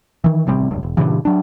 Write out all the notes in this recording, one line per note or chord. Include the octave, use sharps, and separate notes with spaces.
D#3 E3
A1 C3 G3 C4
F1 C#2 G2
E1
G2 A#2 C#3 E3
F#3 D4